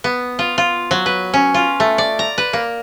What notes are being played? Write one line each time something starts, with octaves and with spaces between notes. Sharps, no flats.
B3
F4
F4
F#3
B4
C#4
F4
A3
D5
A#5
B4
A#3